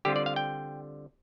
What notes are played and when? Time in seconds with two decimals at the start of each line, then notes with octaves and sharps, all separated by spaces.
0.05 D3 G3 C4 F4 G4
0.16 D5
0.26 F5
0.36 G5